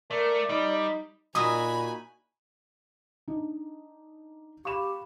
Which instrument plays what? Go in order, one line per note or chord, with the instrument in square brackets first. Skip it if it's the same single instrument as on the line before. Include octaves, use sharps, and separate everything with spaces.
[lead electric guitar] A3 [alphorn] A#4 [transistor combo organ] D5
[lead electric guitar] G3 [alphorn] D#4
[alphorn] A#2 [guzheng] D#4 E4 F#4 [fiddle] G#5 B5 [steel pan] D#6
[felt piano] D4 D#4
[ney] G4 [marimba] F5 B5 [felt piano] C#6 E7